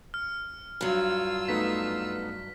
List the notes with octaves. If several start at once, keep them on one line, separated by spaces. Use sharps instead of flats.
F6
G2 F#3 F4 E6
A3 B3 D#4 B6